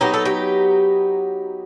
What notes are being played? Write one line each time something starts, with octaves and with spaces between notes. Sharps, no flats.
F#3 B3 D#4 G4
A4
G4